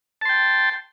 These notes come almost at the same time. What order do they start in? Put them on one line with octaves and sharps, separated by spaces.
A5 C6 G5